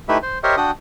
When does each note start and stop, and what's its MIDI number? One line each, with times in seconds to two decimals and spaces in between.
0.09 0.18 57
0.09 0.18 63
0.09 0.18 64
0.09 0.18 67
0.09 0.18 71
0.09 0.18 76
0.23 0.38 72
0.44 0.56 67
0.44 0.56 70
0.44 0.56 72
0.44 0.56 73
0.44 0.56 75
0.44 0.56 76
0.57 0.71 62
0.57 0.71 66
0.57 0.71 79
0.57 0.71 87